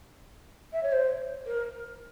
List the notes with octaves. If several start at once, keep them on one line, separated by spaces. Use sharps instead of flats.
E5
C#5
C5
A#4